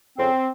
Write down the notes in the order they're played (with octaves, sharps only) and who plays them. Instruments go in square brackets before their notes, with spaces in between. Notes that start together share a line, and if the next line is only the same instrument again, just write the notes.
[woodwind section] F2 C#3 C4